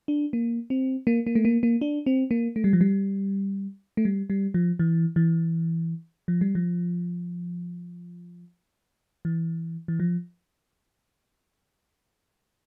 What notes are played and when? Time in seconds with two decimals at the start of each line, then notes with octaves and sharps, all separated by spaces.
0.08 D4
0.33 A#3
0.70 C4
1.07 A#3
1.27 A#3
1.35 A3
1.45 A#3
1.63 A#3
1.81 D4
2.06 C4
2.31 A#3
2.56 A3
2.64 G3
2.73 F3
2.81 G3
3.97 A3
4.05 G3
4.30 G3
4.54 F3
4.79 E3
5.16 E3
6.28 F3
6.41 G3
6.55 F3
9.25 E3
9.88 E3
10.00 F3